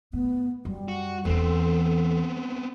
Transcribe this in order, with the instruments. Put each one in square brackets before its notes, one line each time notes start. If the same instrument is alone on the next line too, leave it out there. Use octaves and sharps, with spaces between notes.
[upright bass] A2 [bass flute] B3
[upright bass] F#2 [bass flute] G3
[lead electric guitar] F#4
[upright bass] E2 E3 [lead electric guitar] B3 C4 [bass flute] A4